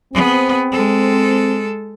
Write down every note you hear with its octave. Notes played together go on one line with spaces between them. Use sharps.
B3 C4 G#4
G#3 A4